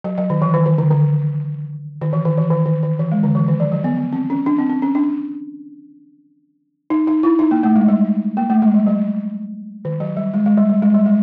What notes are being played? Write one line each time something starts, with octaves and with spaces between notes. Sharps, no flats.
F#3
F#3
D#3
E3
D#3
D#3
D3
D3
D#3
E3
D#3
E3
D#3
D#3
D#3
E3
G#3
D3
E3
D#3
F3
F#3
B3
B3
C4
C#4
D4
C4
C4
C#4
D4
D#4
D#4
E4
D#4
A#3
A3
G#3
G3
A#3
A3
G#3
G3
F#3
D#3
F#3
G3
G#3
G#3
G3
G3
G#3
G3
G#3